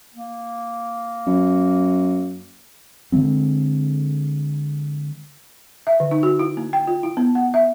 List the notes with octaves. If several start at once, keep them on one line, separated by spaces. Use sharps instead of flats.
A#3
F#2
D3 F3 G#3 C4
E5
D3
D#4
F#4
E4
A#3
G5
F4
E4
B3
F#5
E5